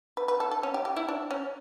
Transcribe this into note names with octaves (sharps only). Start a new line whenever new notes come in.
B4
B4
A4
A4
C#4
G4
G4
E4
D4
C#4